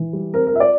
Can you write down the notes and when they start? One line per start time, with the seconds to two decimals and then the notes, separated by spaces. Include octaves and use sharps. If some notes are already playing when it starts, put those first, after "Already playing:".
Already playing: E3
0.13 G3
0.33 C4 A#4
0.47 A#4
0.53 F4 E5
0.60 D5